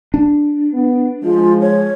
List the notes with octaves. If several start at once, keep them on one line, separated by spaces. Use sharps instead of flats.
D4
B3
F3 G#3 F4
C#5